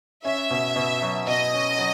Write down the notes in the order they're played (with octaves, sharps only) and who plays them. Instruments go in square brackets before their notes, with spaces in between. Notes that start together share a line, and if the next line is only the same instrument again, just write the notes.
[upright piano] C#4 [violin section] E5
[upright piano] B2
B2
F#3
[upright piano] B2 [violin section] D#5
[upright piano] C#4
F#3